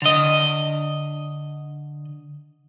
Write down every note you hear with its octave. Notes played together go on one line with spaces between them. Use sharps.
D3 D#5